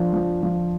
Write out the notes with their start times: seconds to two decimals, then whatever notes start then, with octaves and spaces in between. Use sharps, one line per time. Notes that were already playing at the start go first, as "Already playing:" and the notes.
Already playing: F3 D4
0.14 F3
0.43 F3